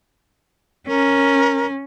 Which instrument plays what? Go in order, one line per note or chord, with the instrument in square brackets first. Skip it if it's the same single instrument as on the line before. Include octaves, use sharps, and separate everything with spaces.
[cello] C#4 [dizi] A#4